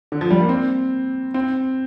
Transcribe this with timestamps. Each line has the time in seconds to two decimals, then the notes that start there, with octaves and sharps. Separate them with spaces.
0.12 D3
0.21 F3
0.30 G3
0.40 A#3
0.49 C4
1.34 C4